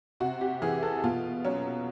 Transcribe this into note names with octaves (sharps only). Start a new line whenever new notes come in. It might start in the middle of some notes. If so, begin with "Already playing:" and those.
C3 F#4
G4
E3 G#4
A4
B2 F4
F#3 C#4